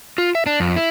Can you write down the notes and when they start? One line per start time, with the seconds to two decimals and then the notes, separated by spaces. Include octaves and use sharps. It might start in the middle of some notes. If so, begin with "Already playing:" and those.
0.18 F4
0.35 E5
0.46 D4
0.60 F2
0.76 E4